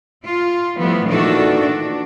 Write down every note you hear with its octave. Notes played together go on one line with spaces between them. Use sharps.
F4
E3 F3 G3 A3 B3
A#2 D#3 E3 D4 F#4 A4
D4